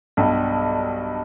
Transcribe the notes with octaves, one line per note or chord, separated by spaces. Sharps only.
B1 G2 G3